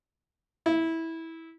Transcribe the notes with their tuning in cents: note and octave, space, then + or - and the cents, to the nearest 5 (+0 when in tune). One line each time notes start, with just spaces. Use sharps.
E4 -15